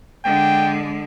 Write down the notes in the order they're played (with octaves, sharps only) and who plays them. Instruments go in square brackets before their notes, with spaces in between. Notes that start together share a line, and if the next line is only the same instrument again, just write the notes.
[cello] D3 G#3 [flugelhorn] G5